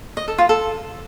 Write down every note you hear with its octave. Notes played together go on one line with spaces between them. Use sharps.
D#5
A4
F4
A4